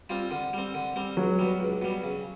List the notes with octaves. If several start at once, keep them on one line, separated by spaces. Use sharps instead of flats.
G3 C4 F4
D3
G3 C4
D3
G3 C4
C#2 F#3
B2 G3
C#2
B2 G3
C#3